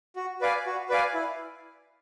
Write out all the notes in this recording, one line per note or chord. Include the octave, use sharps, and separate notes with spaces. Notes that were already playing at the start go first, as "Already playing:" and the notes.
F#4
B4 D5 F5 G#5
F#4
B4 D5 F5 G#5
E4